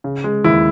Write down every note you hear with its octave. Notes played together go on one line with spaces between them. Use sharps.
C#3
G#3
D#2 E4